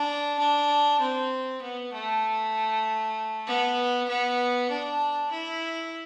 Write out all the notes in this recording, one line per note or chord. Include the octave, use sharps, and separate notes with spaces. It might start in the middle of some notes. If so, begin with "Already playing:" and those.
Already playing: D4
D4
C4
B3
A3
B3
B3
D4
E4